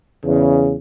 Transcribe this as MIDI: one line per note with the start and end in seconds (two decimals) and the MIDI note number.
0.25 0.74 40
0.25 0.74 49